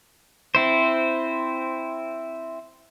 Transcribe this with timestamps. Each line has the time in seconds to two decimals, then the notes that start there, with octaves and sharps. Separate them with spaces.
0.55 C4 E4 C5